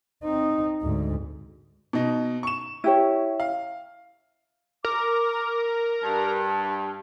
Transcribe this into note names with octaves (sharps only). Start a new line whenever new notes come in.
C4 D#4
D2 G#2
B2 D#4
C#6 E7
E4 G4 C#5
F5
A#4 D6
G2 A5